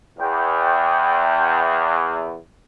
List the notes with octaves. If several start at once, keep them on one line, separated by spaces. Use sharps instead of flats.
E2 G5